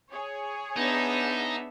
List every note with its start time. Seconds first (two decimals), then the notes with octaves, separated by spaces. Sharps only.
0.10 G#4 C#5
0.76 B3 D4 D#4 E5